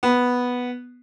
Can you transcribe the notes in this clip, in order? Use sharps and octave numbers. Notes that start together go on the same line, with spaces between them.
B3